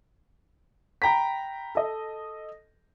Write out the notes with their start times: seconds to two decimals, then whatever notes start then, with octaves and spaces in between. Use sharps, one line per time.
1.02 G5 A#5 B5 B6
1.75 A4 D#5